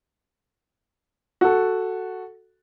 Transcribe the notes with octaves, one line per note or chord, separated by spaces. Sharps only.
F#4 A4